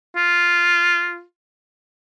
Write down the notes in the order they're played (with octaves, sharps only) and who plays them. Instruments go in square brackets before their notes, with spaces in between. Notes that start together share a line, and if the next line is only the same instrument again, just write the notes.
[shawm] F4